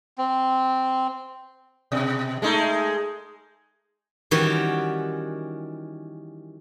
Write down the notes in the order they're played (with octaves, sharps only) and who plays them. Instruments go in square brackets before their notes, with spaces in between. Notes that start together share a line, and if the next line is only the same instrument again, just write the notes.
[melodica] C4
[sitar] B2
G#3 A3 D#4
[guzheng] D#3 E3 G3 C#4 F#4 G4